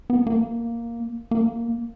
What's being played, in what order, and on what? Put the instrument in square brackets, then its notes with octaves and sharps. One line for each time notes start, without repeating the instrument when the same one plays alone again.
[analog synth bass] B3
A#3
A#3